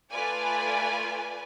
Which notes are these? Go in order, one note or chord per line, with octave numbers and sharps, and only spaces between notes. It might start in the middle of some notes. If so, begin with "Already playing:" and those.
A3 F4 B4 D5 G#5